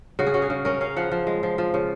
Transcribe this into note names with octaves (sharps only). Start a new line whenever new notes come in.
C#3 F#4
G#4
C#4 F#4
G#4
C#3
C#4 A#4
C#4 F5
F3 F#5
F3
G#3
F3
F3
C#3